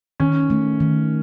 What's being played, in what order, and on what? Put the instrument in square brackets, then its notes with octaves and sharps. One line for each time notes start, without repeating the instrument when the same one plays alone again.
[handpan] D#3 [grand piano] C#4
[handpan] A3
D#3